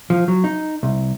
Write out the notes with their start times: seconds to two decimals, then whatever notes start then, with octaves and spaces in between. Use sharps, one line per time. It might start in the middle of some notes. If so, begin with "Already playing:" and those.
0.10 F3
0.28 F#3
0.44 D#4
0.83 C2